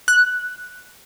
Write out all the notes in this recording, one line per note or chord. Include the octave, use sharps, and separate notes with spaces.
F#6